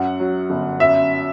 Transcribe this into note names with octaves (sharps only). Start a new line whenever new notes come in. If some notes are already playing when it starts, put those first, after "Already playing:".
Already playing: F#2 F#5
F#3
G1
F#2 E5